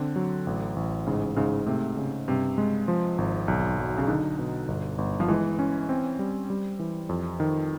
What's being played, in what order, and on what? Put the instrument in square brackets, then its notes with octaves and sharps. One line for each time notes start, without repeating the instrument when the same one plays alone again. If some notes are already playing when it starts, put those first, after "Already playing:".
Already playing: [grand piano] D3 [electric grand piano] C4
[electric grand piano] F#3
A1
A1
[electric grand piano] G#2 [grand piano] C#3
[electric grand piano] G#2 [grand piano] C#3
[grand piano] C3 [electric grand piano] A3
[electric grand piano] C#3
[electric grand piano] G2 [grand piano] C3
[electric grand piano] G#3
F3
G#1
B1
F#3
[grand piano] C#3
[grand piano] D3 [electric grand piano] D#4
[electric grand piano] B2
G1
G1
[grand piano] F3
[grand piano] E3 [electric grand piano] G#3
[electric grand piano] C#4
C4
G3
G3
E3
F2
D#3